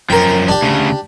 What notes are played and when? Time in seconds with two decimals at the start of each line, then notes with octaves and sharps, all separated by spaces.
0.10 F#2 F3 A#4 G5
0.48 D4 G4
0.62 D2 C#3